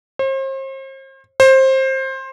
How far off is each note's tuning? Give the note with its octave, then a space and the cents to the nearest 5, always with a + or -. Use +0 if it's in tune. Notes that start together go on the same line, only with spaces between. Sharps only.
C5 +40
C5 +20